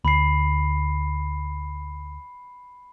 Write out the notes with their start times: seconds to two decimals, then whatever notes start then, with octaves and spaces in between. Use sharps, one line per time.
0.05 D2 B5 C7